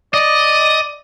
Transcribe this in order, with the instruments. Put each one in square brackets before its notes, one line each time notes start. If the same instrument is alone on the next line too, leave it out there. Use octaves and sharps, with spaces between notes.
[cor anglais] D5 [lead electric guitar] D#5